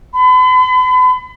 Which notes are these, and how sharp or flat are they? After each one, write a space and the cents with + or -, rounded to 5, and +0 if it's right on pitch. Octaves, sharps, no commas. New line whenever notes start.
B5 +40